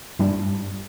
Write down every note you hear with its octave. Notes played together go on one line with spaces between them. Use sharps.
G2 G3 D4